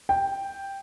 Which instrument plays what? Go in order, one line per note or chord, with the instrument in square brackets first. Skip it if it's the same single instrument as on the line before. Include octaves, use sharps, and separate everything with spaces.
[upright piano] G5